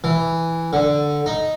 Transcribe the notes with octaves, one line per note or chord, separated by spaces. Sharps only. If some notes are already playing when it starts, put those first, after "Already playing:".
E3
D3
D#4